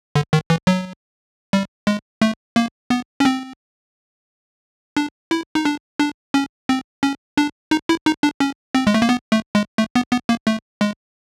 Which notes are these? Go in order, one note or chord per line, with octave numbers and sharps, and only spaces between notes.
D3
D#3
E3
F#3
G3
G#3
A3
A#3
B3
C#4
C4
D4
E4
D#4
D4
D4
C#4
C4
C#4
D4
D#4
E4
D#4
D4
C#4
C4
G#3
A3
A#3
B3
A3
G#3
A3
B3
B3
A#3
A3
G#3